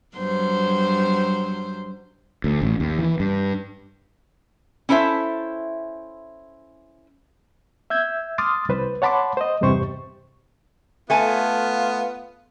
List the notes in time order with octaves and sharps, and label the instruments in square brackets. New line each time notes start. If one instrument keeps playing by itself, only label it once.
[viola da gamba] G2 F#3 C5
[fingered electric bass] D2
A1
D#2
E3
G2
[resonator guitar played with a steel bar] C#4 E4 A4 C5 E5
[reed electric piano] E5 E6 G6 G#6
C6 D6 D#6 F6 A6
C2 B4 C5
C#5 F#5 A5 B5 C6 D6
C5 D#5
E2 G2 C3 G4 C5 C#6
[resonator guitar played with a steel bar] A3 G#5 A5 [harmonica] B3 F4